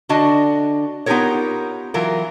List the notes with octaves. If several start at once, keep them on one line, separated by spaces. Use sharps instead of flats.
D3 D4 F#4 D#5
B3 D#4 F4 G4 A#4 C#5
E3 F#3 F4 A#4